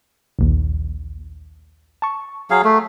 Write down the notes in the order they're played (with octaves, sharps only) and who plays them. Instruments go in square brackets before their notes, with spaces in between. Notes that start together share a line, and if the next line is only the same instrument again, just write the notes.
[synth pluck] A#1 D#2
A5 C#6
[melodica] F#3 G#4 F5
A3